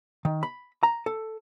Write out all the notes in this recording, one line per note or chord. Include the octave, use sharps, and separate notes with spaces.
D#3
B5
A#5
A4